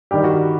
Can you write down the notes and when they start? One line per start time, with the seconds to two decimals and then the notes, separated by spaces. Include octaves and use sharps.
0.11 G2 D#3 G3 G4
0.24 F#4